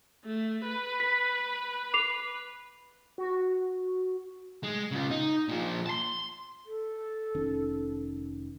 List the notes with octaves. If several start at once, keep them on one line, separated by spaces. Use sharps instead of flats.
A3
B4
B6
D6 C7 F7
F#4
G#3
C#3 F4
D#4
A#2 F3
A5 C6
A4
F1 D#3 C#4